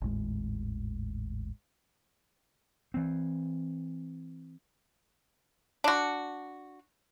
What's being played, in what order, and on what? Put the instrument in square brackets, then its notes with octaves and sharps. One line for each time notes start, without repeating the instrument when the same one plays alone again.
[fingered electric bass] G#1 D#2 A2 G#3
[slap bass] E3 C4
[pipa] D4 F#4